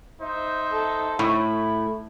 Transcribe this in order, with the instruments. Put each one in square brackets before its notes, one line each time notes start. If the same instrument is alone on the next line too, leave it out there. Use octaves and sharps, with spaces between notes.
[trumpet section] D#4 C5 E5
[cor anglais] A4
[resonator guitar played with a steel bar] A2 [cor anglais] E4